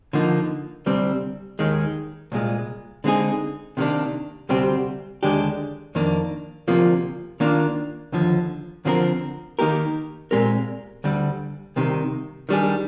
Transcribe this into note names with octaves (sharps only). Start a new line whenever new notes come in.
D3 F3 A#3 D#4
D2 C3 G3 C4
D#2 D#3 G#3
C2 A#2 G#3
D3 G#3 C4 D#4 G#4
C3 D#3 A#3 D4
D2 C3 G3 C4 G4
D#2 D3 G#3 D4 G4
F2 D#3 A#3 D4
D2 C3 F3 A#3 F4
D#3 A#3 D4 F4
D#2 D3 F3
D3 F3 C4 G4 A#4
D#3 A#3 D#4 G4 A#4
A#2 G#3 C4 G4 A#4
D2 D3 G3
C2 C3 D#3
D#3 G3 D4 G#4